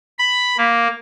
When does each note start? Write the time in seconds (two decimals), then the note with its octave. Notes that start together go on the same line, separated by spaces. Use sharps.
0.19 B5
0.57 A#3